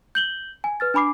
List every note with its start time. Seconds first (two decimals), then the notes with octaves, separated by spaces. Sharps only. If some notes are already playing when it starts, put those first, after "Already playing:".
0.15 G6 F#7 G7
0.64 G#5
0.80 B4 F6 A6
0.94 D4 G#5 B5 D6 C7